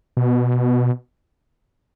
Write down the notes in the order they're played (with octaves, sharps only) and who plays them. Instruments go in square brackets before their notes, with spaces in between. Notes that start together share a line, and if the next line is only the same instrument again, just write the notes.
[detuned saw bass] B2